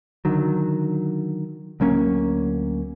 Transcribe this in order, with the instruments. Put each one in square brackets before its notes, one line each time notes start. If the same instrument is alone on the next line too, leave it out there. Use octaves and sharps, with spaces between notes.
[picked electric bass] D3 D#3 F#3
D2 F#3 A#3 C#4